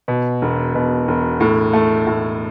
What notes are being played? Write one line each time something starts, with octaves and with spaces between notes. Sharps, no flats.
B2
E1
B2
E1
A2
A3
A2